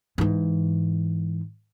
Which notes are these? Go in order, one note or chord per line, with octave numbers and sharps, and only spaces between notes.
G#2 E3